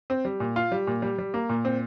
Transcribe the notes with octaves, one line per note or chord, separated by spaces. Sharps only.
C4
G3
A#2
F4
G3
A#2
G3
G3
A#3
A#2
C4